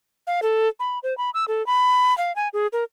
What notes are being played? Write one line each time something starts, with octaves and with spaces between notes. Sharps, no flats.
F5
A4
B5
C5
B5
E6
A4
B5
F5
G#5
G#4
A#4